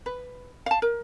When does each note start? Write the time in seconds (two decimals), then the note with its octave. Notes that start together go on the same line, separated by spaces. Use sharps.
0.06 B4
0.66 F5 A5
0.82 A#4